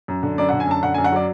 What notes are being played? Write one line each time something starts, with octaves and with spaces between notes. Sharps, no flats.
F#2
D3
F#2 D5
F#5
D3
G#5
F#2 A5
D3 F#5
G#5
F#2
F#5
F#3 D5